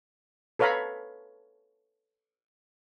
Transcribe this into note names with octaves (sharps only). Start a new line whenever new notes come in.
A4 B4 C#5 F5 A#5 B5